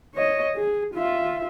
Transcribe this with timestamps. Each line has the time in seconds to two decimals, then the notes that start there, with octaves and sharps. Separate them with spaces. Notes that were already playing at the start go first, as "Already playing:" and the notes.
0.14 C#5 D#5
0.56 G#4
0.94 F4 E5